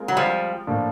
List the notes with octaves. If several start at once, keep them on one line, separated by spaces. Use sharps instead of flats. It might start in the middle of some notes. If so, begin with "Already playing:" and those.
Already playing: G#3 C4 F4 A#4
F#3
F3 G3
A2 F3 A#3 D4